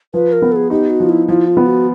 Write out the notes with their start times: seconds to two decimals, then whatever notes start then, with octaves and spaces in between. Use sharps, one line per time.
0.14 F3 B4
0.32 A#4
0.42 B3
0.52 A4
0.56 G#4
0.70 D#4 G4
0.90 F#4
1.00 F3
1.09 E4
1.28 F3 E4
1.47 F4
1.57 B3
1.66 F#4